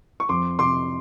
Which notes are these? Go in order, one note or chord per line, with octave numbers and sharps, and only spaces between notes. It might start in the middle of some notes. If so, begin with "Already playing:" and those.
C#6
F2 C6 D6
C3 C6 D6